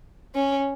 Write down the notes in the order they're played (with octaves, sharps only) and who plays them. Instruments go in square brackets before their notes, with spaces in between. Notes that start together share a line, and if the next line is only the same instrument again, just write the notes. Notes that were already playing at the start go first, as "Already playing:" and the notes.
[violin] C#4